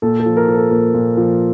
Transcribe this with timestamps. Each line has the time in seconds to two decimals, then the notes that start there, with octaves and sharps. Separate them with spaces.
0.02 A#2 A4
0.20 A4
0.25 F3
0.37 A#4
0.48 F3
0.54 A4
0.71 A#2 A#4
0.94 A#2
1.17 F3